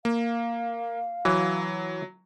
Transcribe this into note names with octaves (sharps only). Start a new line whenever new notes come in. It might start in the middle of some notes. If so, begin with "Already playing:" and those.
A#3 F5
E3 F#3